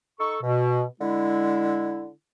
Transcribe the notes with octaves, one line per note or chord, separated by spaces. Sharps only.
D#4 A4 C#6
B2
D3 G#3 E4